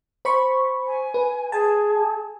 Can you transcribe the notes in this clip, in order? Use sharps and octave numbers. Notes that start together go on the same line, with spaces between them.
C5 B5 C#6
G#5
B4
G#4 G#5 A5